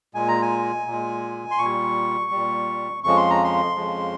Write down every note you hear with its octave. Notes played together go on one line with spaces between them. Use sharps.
A#2 G#3 G#5
A#5
G#5
A#2
G#3
C6
A#2 C#6
G3
A#2 G3
F2 C#3 F3 G#3 C#6
C6
A#5
C6
F2 C#3 F3 G#3